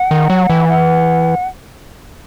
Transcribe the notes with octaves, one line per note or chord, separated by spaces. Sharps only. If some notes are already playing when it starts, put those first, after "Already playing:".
Already playing: F#5
D#3
F#3
E3
F#5